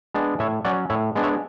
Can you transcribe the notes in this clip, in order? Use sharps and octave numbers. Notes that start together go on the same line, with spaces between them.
G#3 B3 D4
A2 C#5 E5
F#3 C#4 D5 F#5
A2 C#5 E5
G#3 B3 D4
C#5 E5